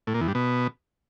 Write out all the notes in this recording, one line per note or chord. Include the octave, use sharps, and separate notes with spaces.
A2
A#2
E2
G2
B2